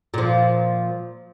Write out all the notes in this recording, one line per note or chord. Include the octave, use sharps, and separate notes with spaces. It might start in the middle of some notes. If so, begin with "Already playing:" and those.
A#2 F3